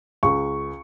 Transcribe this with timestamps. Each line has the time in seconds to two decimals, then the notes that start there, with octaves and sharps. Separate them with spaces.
0.23 C#2 C#6